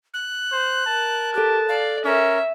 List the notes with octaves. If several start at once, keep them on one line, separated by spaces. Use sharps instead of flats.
F#6
C5
A#4 A5
G4 A4 F#6
D5 F5
C#4 A#4 E5